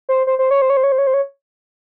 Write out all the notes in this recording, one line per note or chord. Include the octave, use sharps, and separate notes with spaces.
C5
C5
C5
C#5
C5
C#5
C5
C#5
C5
C#5
C5
C#5